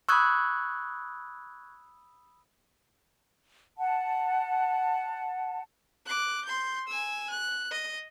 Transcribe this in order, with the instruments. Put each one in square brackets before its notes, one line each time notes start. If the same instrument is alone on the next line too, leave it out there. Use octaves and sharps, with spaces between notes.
[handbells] B5 D#6 E6 [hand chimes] C#6 F#6 G#6
[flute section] F#5 A5
[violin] D6 F#6
C6 G6
G#5 E6
F#6
D#5